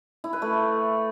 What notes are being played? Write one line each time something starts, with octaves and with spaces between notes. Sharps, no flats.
E4
B4
A3